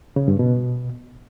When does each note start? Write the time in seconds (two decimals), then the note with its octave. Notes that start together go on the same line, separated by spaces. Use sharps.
0.16 C#3
0.28 G2
0.39 B2